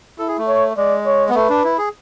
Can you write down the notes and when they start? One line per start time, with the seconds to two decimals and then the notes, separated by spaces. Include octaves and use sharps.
0.19 E4 A4
0.28 G#4
0.38 A3
0.47 C#5
0.77 G#3 D5
1.06 C#5
1.29 B3
1.35 A3 B4
1.50 D4
1.64 E4
1.78 G#4